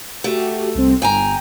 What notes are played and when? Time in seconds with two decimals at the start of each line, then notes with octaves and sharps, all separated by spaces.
0.24 A3 F#4 G4
0.75 C2 C4
1.02 G1 G5 G#5 A#5